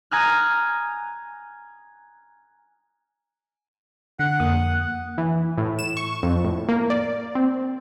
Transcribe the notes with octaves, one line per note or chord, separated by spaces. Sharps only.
G#5 A#5 D#6 F6 F#6
D3 F#5
F2 A#3 D#6
E3
A2
E7
C#6
F2
A2
A#3
D5
C4